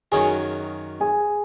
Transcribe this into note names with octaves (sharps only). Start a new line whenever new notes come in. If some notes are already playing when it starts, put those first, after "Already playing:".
F#2 D#3 F#3 C#4 G#4 G#5
G#4 G#5